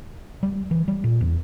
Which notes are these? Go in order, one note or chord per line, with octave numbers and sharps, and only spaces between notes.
G3
E3
G3
A#2
E2